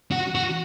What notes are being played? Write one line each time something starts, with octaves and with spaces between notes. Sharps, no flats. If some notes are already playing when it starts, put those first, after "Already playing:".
F#4
F#4